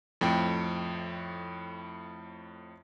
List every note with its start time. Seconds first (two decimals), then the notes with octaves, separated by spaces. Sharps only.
0.21 F2 A2 G5